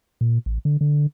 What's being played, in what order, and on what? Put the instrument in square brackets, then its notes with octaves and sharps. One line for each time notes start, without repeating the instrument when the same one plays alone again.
[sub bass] A#2
A1
D3
D3